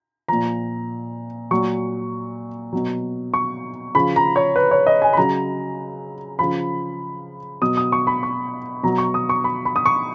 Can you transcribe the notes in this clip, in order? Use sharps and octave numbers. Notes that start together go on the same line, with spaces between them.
A#2 F3 A#5
A#2 F#3 C#6
B2 F#3
C#6
C#3 F3 B5
A#5
C#5
B4
C#5
D#5
G#5
B5
C#3 F#3 A#5
C#3 F3 B5
B2 F#3 D#6
D#6
C#6
B5
C#6
B2 F#3 A#5
C#6
D#6
C#6
B5
B5
D#6
C#6